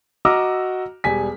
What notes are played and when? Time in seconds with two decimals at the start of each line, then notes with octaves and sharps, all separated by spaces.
0.25 F#4 D#5 A#5 D6 E6 F6
1.04 E1 G3 G#5 B6